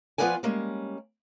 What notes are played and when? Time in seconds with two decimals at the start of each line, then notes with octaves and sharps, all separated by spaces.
0.18 F3 B3 F4 B4 D5 G#5
0.43 G3 G#3 A#3 C#4